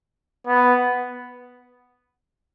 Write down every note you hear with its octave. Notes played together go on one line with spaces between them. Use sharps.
B3